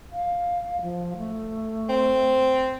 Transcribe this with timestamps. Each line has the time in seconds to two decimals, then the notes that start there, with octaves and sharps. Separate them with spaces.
0.12 F5
0.82 F3
1.17 A3
1.89 C4